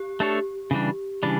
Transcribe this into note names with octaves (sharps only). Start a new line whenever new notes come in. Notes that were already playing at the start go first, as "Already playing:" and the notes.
Already playing: G4
A3 D4 A4 C#5
C#3 E3 G3 D4
C#3 E3 G3 D4